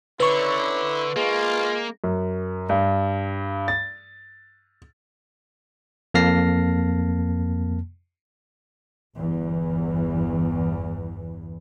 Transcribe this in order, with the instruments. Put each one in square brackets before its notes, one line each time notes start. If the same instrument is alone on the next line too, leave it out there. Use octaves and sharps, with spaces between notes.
[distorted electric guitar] D3 [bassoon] C#4 [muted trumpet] E4 [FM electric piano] B4 C#6
[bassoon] G#3 [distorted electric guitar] A#3 [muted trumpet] F4
[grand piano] F#2
G2
A6
[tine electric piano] F2 A#3 A5 F6 A#6 C7
[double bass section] G1 E2 E3